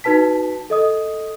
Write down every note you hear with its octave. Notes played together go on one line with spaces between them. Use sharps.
D#4 F#4 B4 A5 B6
A4 D#5 D#6